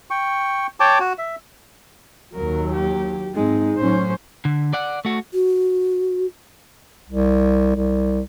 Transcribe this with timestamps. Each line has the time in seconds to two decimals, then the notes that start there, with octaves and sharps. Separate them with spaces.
0.10 G5 C#6
0.80 C#5 G5 A5 D6
1.00 F#4
1.18 E5
2.35 D#2 F#3 A#4
2.72 G4
3.35 G#2 G#3 C4 D#4
3.77 A2 F#3 C#4 C5
4.45 D3
4.73 D5 F#5
5.05 A3 F#4
5.33 F#4
7.10 C2
7.76 C2